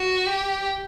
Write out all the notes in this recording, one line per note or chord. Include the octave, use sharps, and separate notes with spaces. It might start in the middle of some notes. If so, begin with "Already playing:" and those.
Already playing: F#4
G4